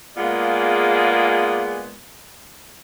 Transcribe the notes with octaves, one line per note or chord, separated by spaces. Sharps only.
G#3 A#3 B3 F4 G#4 D5